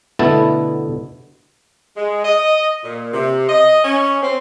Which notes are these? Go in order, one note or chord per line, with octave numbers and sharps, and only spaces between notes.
B2 D3 A3 B3 E4 A5
G#3
D#5
A#2
C3
D#5
C#4
C4